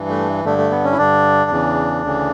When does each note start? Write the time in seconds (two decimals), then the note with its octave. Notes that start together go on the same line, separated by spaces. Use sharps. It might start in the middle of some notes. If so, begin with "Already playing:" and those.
Already playing: G2 E3
0.09 A3
0.45 G2 D3 A3
0.58 A3
0.71 B3
0.84 C#4
0.92 E4
0.97 G2 D3 D4
1.50 E2 C#3 E3
2.03 D2 C#3 E3